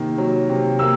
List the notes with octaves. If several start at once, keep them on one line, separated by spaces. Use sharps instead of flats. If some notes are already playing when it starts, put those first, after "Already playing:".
Already playing: C3 D#3 A#3
F#3
C3
A#3 E6